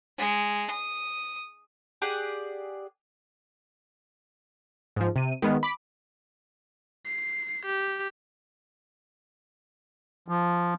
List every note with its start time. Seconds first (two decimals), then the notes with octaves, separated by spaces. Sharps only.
0.18 G#3
0.70 D#6
2.02 G4 G#4 D5 F#5
4.96 G#2 F3
5.16 C3 D#7
5.42 D#3 G#3 B3
5.63 B5 D6
7.05 C7
7.66 G4
10.28 F3